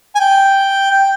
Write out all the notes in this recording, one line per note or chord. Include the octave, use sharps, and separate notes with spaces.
G#5
G5
G5